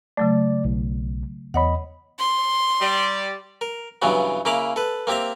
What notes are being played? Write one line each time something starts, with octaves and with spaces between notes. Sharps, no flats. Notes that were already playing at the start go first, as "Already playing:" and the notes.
C#3 F#3 A3 D5
B1
E2 C#5 D#5 F#5 B5
C6
G3 D5
A#4
G2 C#3 E3 F#3 B3
C#3 A#3 E4 A#5 B5 D6
A4 B4
A#3 C4 G4 E5 A#5